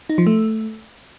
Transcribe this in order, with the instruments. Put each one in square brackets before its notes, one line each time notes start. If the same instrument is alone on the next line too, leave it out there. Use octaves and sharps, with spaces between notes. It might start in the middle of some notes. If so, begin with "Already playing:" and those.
[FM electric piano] D#4
F3
A3